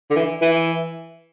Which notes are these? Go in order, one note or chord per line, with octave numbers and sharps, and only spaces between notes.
D3
E3
E3